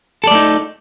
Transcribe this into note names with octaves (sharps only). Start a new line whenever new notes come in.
A3 D#4 A4 D5